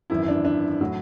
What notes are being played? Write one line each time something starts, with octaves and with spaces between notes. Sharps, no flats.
G#1 F#2 E3 E4
D4
D4
A2 F#3